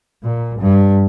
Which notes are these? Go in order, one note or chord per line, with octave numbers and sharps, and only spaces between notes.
A#2
G2